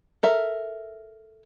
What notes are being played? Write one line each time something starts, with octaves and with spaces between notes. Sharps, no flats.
A4 A#4 E5